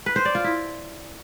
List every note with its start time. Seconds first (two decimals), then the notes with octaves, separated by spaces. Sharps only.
0.06 B4
0.16 C5
0.25 D5
0.35 F4
0.44 E4